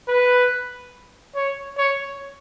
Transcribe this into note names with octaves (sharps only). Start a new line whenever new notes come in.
B4
C#5
C#5